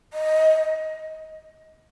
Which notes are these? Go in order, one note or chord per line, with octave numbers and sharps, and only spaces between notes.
D#5